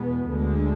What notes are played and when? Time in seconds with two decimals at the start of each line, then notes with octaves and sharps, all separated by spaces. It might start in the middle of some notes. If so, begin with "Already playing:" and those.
Already playing: E2 B2 G#3 B3
0.30 D2 D3 G#3